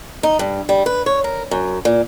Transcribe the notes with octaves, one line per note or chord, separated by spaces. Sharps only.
D#4
G2
G3
B4
C#5
A#4
F#2
A#2